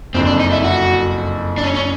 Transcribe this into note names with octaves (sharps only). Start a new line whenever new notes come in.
F#1 F2 D3 C4
D4
D#4
E4
F#4
D4
C#4
C#4